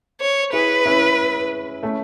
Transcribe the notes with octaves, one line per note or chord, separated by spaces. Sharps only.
C#5
E4 G#4 B4
C#4 E4
A3 C#4